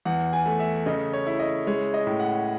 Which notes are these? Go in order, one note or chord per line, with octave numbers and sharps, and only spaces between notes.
E2 F#5
G#5
A3
E5
C#3 D#5
C#5
E4
D#5
G#3 C#5
D#5
A2
F#5